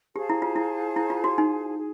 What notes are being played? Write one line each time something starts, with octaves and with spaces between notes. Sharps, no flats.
G4 G#4 C5 F5 A5
E4
F4
E4
E4
F4
F#4
D#4
G#4